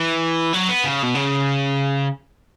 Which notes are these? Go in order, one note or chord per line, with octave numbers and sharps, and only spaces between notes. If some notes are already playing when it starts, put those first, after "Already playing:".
Already playing: E3
F#3
B3
C#3
B2
C#3